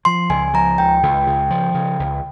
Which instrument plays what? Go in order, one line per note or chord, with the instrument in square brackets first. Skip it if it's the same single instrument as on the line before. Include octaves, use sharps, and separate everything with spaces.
[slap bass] F3 [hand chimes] C6
[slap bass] C#2 [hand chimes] G#5
[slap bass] F3 [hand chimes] A#5
[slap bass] C#2 [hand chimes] G5
[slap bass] C#2
C#3
F3
C#3
C#2